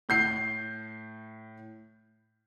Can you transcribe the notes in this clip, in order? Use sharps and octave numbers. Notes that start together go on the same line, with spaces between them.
A2 G6 C7